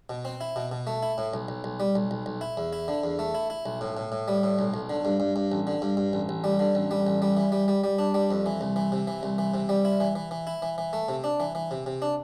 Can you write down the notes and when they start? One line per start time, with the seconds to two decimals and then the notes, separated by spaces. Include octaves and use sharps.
0.10 B2
0.25 C4
0.41 E4
0.56 B2
0.72 B2
0.87 A3
1.03 E4
1.18 A2
1.34 B1
1.48 B1
1.64 B1
1.80 G3
1.95 B1
2.11 B1
2.26 B1
2.41 E4
2.57 E2
2.73 E4
2.88 D3
3.04 E2
3.19 A3
3.35 E4
3.50 E4
3.66 B1
3.81 A2
3.97 A2
4.12 A2
4.28 G3
4.43 A2
4.59 B1
4.74 B1
4.90 D3
5.05 G2
5.20 G2
5.36 G2
5.52 A1
5.67 D3
5.82 G2
5.97 G2
6.13 A1
6.29 A1
6.44 G3
6.59 D3
6.75 A1
6.91 G3
7.07 A1
7.22 G3
7.37 E3
7.52 G3
7.68 G3
7.84 G3
7.99 D4
8.14 G3
8.31 F2
8.46 E3
8.61 C2
8.76 E3
8.92 C3
9.07 E3
9.23 C2
9.38 E3
9.54 C3
9.69 G3
9.85 E4
10.00 E3
10.15 E3
10.31 E3
10.47 E4
10.62 E3
10.78 E3
10.93 A3
11.09 C3
11.24 D4
11.40 E3
11.55 E3
11.71 C3
11.86 C3
12.02 D4